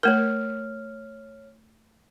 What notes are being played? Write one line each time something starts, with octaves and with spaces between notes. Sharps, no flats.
A3 A#4 C#5 F6